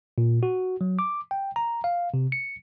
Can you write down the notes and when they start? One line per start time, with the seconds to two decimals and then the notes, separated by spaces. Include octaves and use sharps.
0.18 A#2
0.43 F#4
0.81 F#3
0.99 D6
1.31 G5
1.56 A#5
1.84 F5
2.14 C3
2.32 C#7